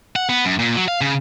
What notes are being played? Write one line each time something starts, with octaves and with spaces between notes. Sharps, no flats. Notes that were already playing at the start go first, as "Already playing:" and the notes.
F#5
B3
F#2
A#2
F#3
F5
C#3